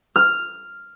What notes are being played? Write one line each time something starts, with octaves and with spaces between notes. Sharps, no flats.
F6